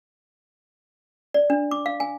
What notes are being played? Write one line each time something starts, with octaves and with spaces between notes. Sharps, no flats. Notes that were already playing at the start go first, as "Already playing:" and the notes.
D5
D4
D6
F5
G#5